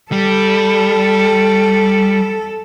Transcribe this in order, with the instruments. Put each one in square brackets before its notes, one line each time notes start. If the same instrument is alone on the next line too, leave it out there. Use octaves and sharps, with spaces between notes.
[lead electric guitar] G3 [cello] A4